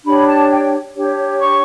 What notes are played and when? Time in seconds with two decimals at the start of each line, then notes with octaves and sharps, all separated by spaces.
0.04 D4 G4 C#5 B5
0.27 A5
0.50 G5
0.95 D4 G4 C#5
1.40 C#6